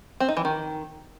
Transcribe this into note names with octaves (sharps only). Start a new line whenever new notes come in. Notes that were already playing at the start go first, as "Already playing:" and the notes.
C4
D#4
E3
D#3